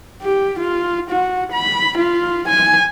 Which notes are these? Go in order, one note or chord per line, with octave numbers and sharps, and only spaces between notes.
G4
F4
F#4
B5
F4
G#5